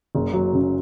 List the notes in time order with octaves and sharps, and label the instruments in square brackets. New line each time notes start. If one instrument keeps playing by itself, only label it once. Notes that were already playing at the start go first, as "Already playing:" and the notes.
[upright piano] F#1
F#3
C#3